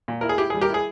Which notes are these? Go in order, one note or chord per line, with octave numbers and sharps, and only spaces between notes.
A#2
E4 A#4
G#4
E4 G4
G#4
G3
G4 A#4
E4 G#4